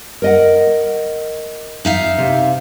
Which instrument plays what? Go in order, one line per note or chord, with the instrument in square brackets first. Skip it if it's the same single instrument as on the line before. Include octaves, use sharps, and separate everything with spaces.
[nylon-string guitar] A#4 D#5 F#5
[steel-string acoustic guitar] D#4 E5 F5
[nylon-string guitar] C3